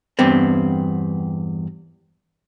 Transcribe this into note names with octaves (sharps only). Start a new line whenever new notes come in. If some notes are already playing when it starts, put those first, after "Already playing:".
E2 G2 B3 C4